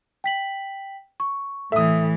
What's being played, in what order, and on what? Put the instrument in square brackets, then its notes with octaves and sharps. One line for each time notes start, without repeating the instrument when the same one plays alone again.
[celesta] G5 B6 F#7
C#6
[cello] A2 E3 [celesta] A4 [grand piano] E5 D#6